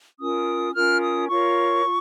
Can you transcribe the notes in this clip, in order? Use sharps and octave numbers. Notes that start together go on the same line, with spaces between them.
C#4 F4 A#4 D#6
C#4 F4 A#4 F6
D#6
F4 A#4 C#5 C#6
F4